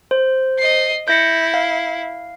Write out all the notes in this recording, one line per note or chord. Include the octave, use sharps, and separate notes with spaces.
C5
D#5 C7
E4 G6 A#6 C#7
F5